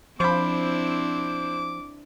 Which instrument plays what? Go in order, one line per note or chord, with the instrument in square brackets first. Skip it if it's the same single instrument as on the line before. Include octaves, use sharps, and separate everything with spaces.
[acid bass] F3 [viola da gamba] C4 D4 E4 [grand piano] C5 B5 [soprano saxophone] D6